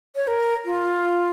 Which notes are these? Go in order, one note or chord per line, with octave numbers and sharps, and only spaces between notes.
C#5
A#4
F4